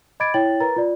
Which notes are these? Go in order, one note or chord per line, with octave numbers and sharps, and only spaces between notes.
D#5 B5 D6 G#6 A6 D7
E4 C#5 G5 A6 F#7
A#4 B4 A#5 A6
F4 D5